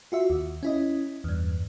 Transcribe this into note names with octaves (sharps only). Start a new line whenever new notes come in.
F4 F#4 E5
D#2
C#4 E4 D#5
E2 G2